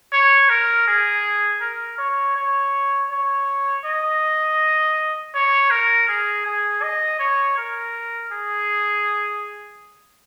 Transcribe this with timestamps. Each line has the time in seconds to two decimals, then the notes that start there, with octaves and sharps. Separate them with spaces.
0.12 C#5
0.49 A#4
0.87 G#4
1.61 A#4
1.98 C#5
2.36 C#5
3.10 C#5
3.85 D#5
5.34 C#5
5.70 A#4
6.08 G#4
6.46 G#4
6.82 D#5
7.19 C#5
7.57 A#4
8.31 G#4